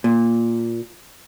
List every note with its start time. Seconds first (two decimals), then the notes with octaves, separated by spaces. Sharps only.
0.04 A#2